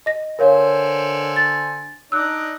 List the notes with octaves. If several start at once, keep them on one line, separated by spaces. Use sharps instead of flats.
D#5 A#6
D3 A#4 C5 C#5 F5 G#5
A6
D4 D#4 D5 E6 F#6